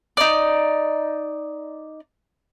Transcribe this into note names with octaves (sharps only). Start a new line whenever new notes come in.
D#4 D5